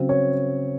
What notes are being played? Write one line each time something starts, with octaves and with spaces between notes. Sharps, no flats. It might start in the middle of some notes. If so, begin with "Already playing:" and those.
Already playing: C#3 F#3 C4
C#5